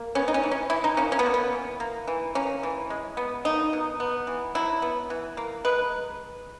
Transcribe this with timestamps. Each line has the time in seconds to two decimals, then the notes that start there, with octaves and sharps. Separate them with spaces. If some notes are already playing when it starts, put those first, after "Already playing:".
Already playing: A#3
0.15 B3 C#4
0.28 D#4
0.34 C#4
0.43 E3
0.51 C#4
0.70 E3 E4
0.84 D#4
0.97 A#3 C#4
1.12 C#4
1.19 B3
1.26 A#3
1.34 B3
1.52 E3
1.80 A#3
2.08 E3
2.35 A#3 C#4
2.63 E3
2.90 G#3
3.17 B3
3.45 A#3 D#4
3.73 B2
4.00 B3
4.27 E3
4.55 F#3 E4
4.82 B3
5.10 E3
5.37 A#3
5.65 G#3 B4